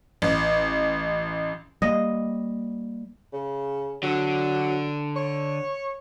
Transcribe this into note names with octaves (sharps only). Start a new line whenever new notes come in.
A1
G3 A#3 D#5
C#3
D3 F#3
C#5